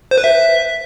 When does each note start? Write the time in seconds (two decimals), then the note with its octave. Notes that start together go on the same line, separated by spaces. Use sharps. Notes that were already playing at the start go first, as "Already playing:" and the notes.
0.11 C5
0.18 B4
0.24 E5